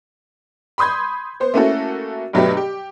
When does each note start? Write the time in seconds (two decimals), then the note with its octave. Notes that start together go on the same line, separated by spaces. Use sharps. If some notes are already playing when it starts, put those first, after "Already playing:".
0.78 B5 C6 D#6 G6 G#6
1.40 B3 C5
1.54 A3 A#3 C#4 E4 F#4 A4
2.33 G2 B2 F#3 A3 B3 G4
2.57 G4